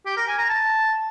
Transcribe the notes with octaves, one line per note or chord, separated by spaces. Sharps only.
G4
A#4
G#5
A#5
A5